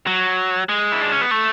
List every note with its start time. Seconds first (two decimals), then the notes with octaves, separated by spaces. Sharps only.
0.07 F#3
0.69 G#3
0.92 E4
1.02 D4
1.12 C#4
1.21 B3
1.31 A3